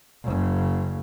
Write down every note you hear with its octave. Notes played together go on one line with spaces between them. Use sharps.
F#1 C#3